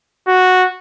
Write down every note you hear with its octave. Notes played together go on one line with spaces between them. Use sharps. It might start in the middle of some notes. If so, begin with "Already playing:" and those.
F#4